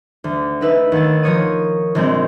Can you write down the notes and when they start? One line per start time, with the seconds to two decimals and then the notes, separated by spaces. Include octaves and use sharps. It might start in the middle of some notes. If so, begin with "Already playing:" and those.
0.24 D2
0.61 A3 D#4 B4 E5
0.92 D#2 F#5 A6
1.23 F3 A#4 C#5 D#6 D#7
1.95 A#1 D3 G#3 C4 G6